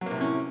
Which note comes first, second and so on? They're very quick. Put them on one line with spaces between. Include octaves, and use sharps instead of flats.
F#3 A#3 C3 A2 C#4